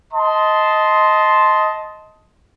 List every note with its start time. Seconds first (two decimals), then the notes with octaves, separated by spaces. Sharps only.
0.13 D#5 A5 C6